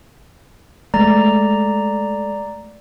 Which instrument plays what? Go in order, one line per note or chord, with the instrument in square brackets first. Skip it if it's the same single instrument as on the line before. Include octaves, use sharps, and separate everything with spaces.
[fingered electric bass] G#3 A3 [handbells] D5 A#5